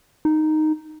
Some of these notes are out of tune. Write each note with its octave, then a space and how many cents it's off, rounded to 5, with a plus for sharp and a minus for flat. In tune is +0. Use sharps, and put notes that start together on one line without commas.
D#4 -5